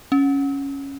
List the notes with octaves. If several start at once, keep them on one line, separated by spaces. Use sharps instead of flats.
C#4